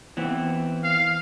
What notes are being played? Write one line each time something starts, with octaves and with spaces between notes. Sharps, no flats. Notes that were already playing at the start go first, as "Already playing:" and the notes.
E3 B3 C4
F5